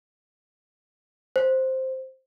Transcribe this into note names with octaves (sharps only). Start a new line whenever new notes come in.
C5